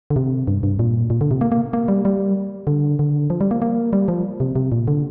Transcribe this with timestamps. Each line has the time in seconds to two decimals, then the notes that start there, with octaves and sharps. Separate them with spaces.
0.10 D3
0.16 C3
0.47 G2
0.63 G2
0.79 A#2
1.10 A#2
1.21 D3
1.31 C3
1.41 A#3
1.52 A#3
1.73 A#3
1.88 G3
2.05 G3
2.67 D3
2.99 D3
3.30 F3
3.41 G3
3.51 A#3
3.62 A#3
3.93 G3
4.08 F3
4.40 C3
4.56 C3
4.72 A#2
4.88 D3